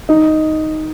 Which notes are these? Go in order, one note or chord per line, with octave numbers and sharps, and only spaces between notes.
D#4